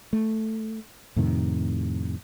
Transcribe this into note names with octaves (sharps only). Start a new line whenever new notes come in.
A3
F2 A2 C3 D#3